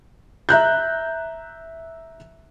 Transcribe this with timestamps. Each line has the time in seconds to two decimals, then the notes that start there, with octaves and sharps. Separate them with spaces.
0.49 E5 A#5 F#6 G6